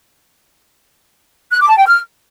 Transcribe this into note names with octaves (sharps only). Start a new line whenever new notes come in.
F#6
D6
A5
G5
F6